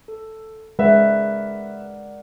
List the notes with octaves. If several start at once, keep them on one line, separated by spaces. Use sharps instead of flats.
A4
G#3 A#4 B4 D5 E5 F#5